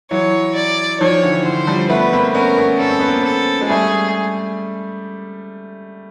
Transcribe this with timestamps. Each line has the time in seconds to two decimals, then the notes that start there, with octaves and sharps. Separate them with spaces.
0.11 E3 F#3 C#5
0.55 D5
1.00 D#3 F3 C#5
1.23 D3 E3
1.45 D3 C5
1.67 F3 G3
1.90 A3 B3 B4
2.13 A#3 C4
2.35 B3 C#4 A#4
2.57 B3 C#4
2.80 C#4 A4
2.89 C4
2.99 B3
3.08 A#3 C4
3.25 A4
3.61 G#3
3.69 G3 A3 G#4